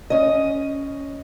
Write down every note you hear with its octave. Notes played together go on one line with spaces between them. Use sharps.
C#4 D#5